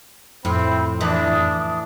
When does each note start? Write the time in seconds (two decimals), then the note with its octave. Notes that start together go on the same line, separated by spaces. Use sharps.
0.45 F2 A2 C4 B5
1.01 E3 D4 D#6